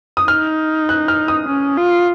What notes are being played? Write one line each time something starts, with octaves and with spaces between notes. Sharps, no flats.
D#6
D#4 F6
F#6
F6
D#6
C#4
F4